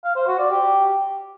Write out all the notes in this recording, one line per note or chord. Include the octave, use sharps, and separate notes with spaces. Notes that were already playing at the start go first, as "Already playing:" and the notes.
F5
C5
F#4
D5
G4